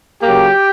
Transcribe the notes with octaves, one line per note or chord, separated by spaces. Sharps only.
C#3 F#3 A#3 G4